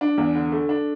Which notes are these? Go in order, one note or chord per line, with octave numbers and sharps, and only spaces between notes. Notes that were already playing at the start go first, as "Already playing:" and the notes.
D4
E2
D3
A3
D4